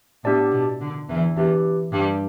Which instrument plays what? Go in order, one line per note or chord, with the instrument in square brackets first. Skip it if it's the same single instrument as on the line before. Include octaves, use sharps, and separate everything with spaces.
[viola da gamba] A2 [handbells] B3 D4 G4 D5 A5
[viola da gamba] B2
D3
E2 E3
[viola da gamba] E2 E3 [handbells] D4 G4 B4
[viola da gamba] G2 G3